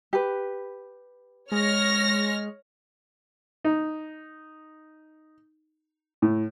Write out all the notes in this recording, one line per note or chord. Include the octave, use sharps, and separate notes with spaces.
G4 B4
G#3 C#5 F6 A#6
D#4
A2